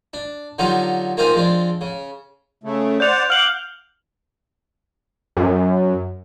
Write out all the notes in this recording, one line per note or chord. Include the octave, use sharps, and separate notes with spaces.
D4
D3 F#3 D#4 F4 G4
A#3 C4 D#4 F4 C5 G#5
F3 G#3 C4 D4
C#3
C#3 A3
C5 D5 F#5 G6 F7
F5 F#5 D6 F6 F#7
F#2